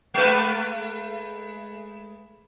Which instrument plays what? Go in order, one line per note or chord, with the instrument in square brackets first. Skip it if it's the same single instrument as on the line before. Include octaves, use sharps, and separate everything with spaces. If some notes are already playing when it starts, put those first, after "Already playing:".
[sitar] G#3 A3 B4